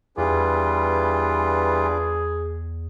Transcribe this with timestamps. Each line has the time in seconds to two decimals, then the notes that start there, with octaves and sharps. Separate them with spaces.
0.17 E2 E3 G3 D4 F4 G#4 B4 D6